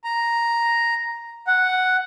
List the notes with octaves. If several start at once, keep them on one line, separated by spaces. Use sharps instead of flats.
A#5
F#5